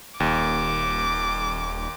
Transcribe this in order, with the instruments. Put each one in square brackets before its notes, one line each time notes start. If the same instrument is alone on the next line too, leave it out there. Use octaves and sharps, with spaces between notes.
[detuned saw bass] D#1 [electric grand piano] D#2 [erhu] D6